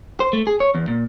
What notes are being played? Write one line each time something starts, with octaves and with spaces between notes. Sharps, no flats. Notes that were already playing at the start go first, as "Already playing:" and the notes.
C5
A3
G#4
C#5
E2
A#2